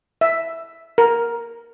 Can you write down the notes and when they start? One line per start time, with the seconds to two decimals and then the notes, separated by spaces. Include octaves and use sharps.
0.21 E5
0.98 A#4